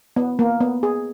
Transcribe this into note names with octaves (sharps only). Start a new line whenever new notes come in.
B3
A#3
B3
G#4